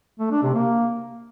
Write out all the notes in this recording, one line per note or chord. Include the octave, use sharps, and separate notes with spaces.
A3
D4
C3
A#3